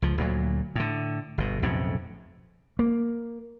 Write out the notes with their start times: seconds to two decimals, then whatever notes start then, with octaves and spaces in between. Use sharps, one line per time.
0.02 C#2 F3
0.18 D2 A#2 F#3
0.75 A2 D3
1.38 G1 B2
1.62 B1 F2 A2 C#3
2.79 A#3